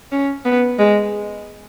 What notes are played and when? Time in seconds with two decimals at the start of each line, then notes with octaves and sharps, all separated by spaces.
0.12 C#4
0.45 B3
0.79 G#3